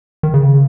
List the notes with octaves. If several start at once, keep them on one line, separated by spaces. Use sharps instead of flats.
D#3
C#3